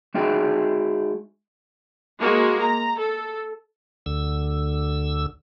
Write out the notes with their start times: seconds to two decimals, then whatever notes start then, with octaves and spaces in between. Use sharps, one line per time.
0.14 G#3 D#4 F#4 G#4 E5 G5
2.19 G#3 A#3 F#4
2.59 A#5
2.97 A4
4.06 D2 D3 E6